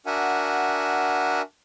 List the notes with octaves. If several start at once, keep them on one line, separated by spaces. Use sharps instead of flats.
D4 F#4 A#4 E5 F#5 G#5